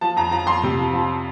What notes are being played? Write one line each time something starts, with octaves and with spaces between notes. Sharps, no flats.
F3 A5
F2 A#5
F3 A#5
F2 C6
C3
F3
F3